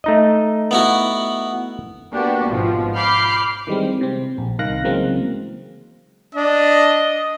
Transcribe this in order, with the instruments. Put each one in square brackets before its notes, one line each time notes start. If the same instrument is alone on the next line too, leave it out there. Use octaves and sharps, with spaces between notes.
[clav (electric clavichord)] A3 D#4 D#5
[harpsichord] B3 E4 F#4
[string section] A#3 B3 D4 F#4 G4
G#1 B2 F3
B5 D6 F6 G6 C7
[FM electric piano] D#3 E3 G3 G#3 C4
C3 C4
A#1
C2 D#3 F5 F#6 A#6
C#3 E3 F#3 G#3 A#3 C4
[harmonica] D4 [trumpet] D#5